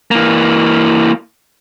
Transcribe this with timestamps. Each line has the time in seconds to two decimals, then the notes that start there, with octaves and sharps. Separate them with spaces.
0.11 E3 A#3